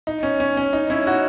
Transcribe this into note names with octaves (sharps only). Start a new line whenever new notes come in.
D#4
C#4
C#4
C#4
D#4
C#4 E4
D#4 F#4